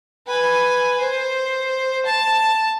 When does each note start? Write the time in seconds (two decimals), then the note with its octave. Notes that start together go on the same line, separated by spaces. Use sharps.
0.27 B4 G#5
1.00 C5
2.06 A5